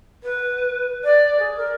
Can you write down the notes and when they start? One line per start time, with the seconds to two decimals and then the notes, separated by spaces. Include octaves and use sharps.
0.23 B4
1.03 D5
1.39 G#4
1.56 A#4